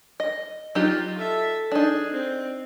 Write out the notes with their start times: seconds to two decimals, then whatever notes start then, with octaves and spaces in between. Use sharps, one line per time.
0.20 D#5
0.75 F#3 D#4 F4 G4
1.18 A4 E5
1.72 D4 D#4 G#4
2.12 C4